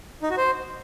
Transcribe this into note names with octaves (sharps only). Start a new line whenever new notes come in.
D#4
F#4
C5